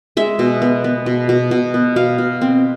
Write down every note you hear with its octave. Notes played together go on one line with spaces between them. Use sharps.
G#3 E5
B2
B3
B3
B2
B2
B2
B3
B2 F5
B2
C4